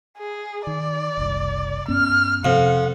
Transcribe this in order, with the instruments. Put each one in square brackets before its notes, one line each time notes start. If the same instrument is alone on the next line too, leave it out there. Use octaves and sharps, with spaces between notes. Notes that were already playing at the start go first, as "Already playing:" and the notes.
[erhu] G#4
[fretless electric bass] D#3 [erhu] D5
[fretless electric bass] F#1 C2
[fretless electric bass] G2 B3 C#4 [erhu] F6
[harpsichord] F2 [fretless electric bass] C3 [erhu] F#5